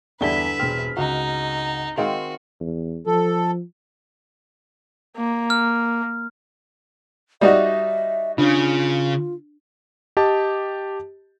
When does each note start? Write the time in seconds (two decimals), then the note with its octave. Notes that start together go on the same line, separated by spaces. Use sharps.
0.21 E2 G2 D3 E4 B4 E5 G7
0.59 E1 C4 F6
0.97 C#2 D#4 F#4
1.98 D#3 G#3 C4 F#4 F5
2.60 E2
3.07 F3 A4
5.16 A#3
5.50 F6
7.41 G3 D#4 F#4 D5 E5
8.38 C#3 D4 F4
10.17 G4 D#5 A5